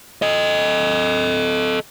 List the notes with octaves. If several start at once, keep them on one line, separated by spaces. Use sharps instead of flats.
A4 D#5